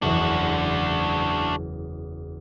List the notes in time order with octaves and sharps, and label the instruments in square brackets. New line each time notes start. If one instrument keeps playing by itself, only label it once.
[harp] F#1 E2 [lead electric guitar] D4 F#4